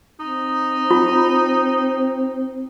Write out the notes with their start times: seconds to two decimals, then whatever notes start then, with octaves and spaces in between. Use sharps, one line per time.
0.20 C4 D#4
0.91 F4